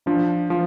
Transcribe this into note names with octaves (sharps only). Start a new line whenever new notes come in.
F3 D4
F3